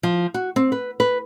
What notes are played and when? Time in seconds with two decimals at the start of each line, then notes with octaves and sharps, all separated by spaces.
0.03 F3
0.34 F#4
0.56 C4
0.72 B4
1.00 B4